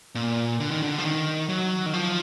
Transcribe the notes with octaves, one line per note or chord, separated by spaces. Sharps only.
A#2
D3
D#3
D3
F3
D#3
F#3
D#3
F3